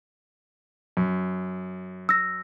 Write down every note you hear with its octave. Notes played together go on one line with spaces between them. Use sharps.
F#2
E6 A#6